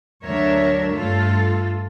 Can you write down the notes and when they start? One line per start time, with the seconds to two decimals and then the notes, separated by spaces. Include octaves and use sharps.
0.23 D2 F#3 D4 A#4 C#5 E5
0.93 G2 A3 F4 A4